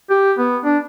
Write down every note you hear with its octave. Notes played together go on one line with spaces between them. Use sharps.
G4
B3
D4